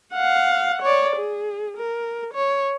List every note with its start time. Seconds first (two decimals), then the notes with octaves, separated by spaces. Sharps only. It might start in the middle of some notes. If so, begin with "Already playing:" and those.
0.13 F5 F#5
0.82 C#5 D5
1.16 G#4
1.78 A#4
2.34 C#5